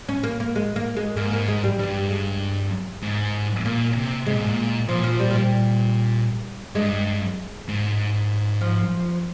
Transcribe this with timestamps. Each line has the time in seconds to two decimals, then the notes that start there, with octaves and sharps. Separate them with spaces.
0.09 C#4
0.23 A#3
0.40 A#3
0.56 G#3
0.76 A#3
0.97 G#3
1.16 G#2 A#3
1.33 A#3
1.48 G#3
1.64 G3
1.79 G2 G3
2.11 G#3
3.02 G#2
3.65 A#2 A#3
3.97 C3
4.27 C3 G#3
4.33 A#2
4.41 G#2
4.48 A#2
4.88 A#2 F3
5.04 F3
5.20 G3
5.31 F3
5.35 G3
6.75 G2 G#3
7.68 G#2
8.61 F3